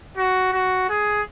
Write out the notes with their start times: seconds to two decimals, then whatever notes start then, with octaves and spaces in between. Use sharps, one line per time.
0.17 F#4
0.52 F#4
0.89 G#4